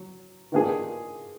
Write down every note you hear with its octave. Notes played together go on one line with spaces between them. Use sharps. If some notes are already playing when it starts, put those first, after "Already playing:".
Already playing: F#3
D#3 A#3 D4 F4 G#4